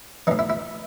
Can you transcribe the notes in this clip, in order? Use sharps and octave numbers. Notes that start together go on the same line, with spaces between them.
A2 E3 D#4
E4
E4